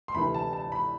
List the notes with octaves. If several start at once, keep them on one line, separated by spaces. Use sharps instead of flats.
C6
D2 C3 E3 B5
A5
A5
B5